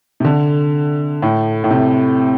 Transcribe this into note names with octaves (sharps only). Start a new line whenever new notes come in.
C3
D3
A2
A2
C3